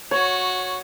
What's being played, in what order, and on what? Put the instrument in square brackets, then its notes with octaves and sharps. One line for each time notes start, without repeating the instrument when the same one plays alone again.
[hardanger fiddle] F#4 [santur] C#5